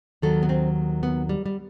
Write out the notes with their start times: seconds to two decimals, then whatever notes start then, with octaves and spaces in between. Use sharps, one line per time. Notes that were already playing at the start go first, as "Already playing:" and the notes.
0.22 D#2 D#3 F#3 A4
0.43 B3
0.49 C4
1.03 B3
1.29 G3
1.46 G3